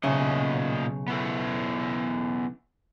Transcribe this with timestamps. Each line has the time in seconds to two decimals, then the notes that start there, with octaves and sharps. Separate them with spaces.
0.03 B1 A#2 C#3 D#5 E5
1.08 B3 E4 A4